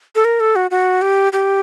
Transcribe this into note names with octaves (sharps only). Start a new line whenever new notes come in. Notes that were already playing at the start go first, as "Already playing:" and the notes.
A4
A#4
A4
F#4
F#4
G4
G4